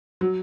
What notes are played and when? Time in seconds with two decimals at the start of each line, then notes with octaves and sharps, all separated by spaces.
0.21 F#3